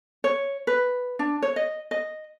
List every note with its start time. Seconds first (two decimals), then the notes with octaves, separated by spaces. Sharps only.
0.24 C#5
0.67 B4
1.19 D4
1.42 C#5
1.56 D#5
1.91 D#5